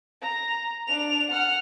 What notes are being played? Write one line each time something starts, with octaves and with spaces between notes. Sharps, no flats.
A#5
D4 F7
F#5 F6